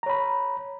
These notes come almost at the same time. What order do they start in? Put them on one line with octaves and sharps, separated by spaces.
A#5 C#5 B5